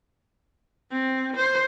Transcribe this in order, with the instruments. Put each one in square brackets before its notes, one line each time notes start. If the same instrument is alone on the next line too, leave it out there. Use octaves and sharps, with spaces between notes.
[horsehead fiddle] C4
C5